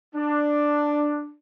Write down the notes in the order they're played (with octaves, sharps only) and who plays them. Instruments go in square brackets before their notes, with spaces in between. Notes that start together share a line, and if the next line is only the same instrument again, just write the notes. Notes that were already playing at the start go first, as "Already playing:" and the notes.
[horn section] D4